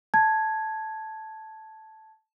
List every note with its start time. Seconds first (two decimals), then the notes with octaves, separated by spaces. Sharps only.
0.14 A5 G#6